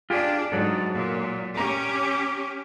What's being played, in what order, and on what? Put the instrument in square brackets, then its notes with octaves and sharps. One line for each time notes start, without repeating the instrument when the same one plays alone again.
[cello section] D4 [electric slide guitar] F4 G4 G#4
[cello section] G#2 [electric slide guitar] F#3 A4
[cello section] A#2
[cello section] C#4 G4 [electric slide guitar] A#5